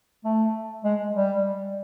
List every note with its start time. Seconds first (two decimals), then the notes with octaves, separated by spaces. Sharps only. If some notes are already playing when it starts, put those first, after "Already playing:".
0.24 A3
0.84 G#3
1.14 G3